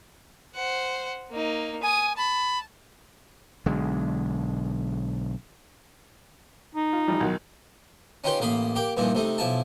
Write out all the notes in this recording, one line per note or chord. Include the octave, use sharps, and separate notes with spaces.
C5 F#5
A#3 D#4
G#5 D#6
A5 B5
B1 D3 G#3
D#4
F4
A1 F3 G3
B1 D#3 F#4
C#4 D#4 F4 G4 B4 C5
A1 A#3 D#5 F5 B5
A#3 G4 G5
G2 A#2 E3 F3 D#4
C3 A3 D#4
B1 F3 E4 G#5 A5